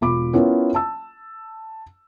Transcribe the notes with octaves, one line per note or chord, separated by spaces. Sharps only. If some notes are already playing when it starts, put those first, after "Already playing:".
E1 F4 B5 D6
B3 C#4 E4 F4 A#4
A5 E6